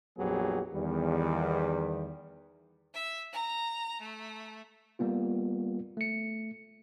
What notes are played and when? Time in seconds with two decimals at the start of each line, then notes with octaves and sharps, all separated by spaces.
0.18 A#1 F2 F#3 B3 G4 G#4
0.74 E2 D#3 G3
2.94 E5
3.32 A#5
4.01 A3
4.99 G3 A#3 B3 F4
5.97 A3 C#7